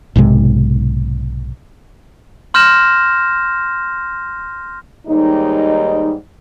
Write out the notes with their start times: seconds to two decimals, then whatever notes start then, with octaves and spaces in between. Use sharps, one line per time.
0.16 B1 G#2 C3 G#3
2.54 C6 F6 G6 A#6 E7
5.07 D#2 G#2 G3 D#4